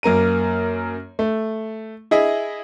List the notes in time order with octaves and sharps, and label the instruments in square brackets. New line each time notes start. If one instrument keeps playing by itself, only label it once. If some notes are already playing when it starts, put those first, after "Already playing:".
[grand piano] F#2 A#3 A#5 D#7
A3
E4 G#4 D#5 E5